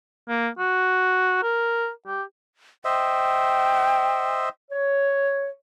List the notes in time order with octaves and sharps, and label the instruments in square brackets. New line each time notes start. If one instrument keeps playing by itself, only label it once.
[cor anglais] A#3
F#4
A#4
G4
[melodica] C5 D#5 E5 [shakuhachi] G5
[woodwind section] C#5